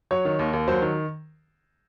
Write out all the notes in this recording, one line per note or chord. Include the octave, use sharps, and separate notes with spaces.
F#3 C#5
D#3
D#2
D#2
F#3 C5
D#3